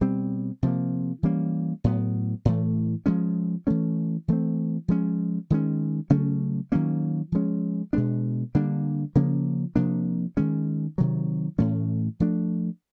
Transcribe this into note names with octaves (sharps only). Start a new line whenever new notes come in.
B2 G3 C4
C3 F3 A#3
E3 G3 A#3 C#4
A2 F#3 B3
A2 E3 A3
F3 G#3 C#4
E3 A3 C#4
E3 A3 C4
F3 G#3 C#4
D#3 G#3 C#4
C#3 F#3 A3 C#4
D#3 F#3 A#3 C#4
F3 G#3 C#4
B2 G#3 B3 D4
D3 G3 A#3 D4
C#3 F3 A#3 C#4
C3 F3 A#3 D4
D#3 G#3 C#4
C3 D#3 F#3
A2 E3 A3 C#4
F3 A3 D4